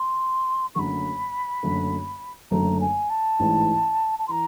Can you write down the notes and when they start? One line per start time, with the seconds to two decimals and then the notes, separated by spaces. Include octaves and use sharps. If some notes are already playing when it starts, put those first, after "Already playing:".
Already playing: C6
0.75 F#1 F#2 D3 F#3 A3 B5 C#6
1.63 F#1 F#2 D3 F#3 A3
2.51 F#1 F#2 D3 F#3 A3 A#5
2.81 G#5
3.10 A5
3.39 A1 G#2 E3
4.19 A5
4.27 E3 A#5 C6